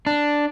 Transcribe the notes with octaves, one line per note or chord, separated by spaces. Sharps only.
D4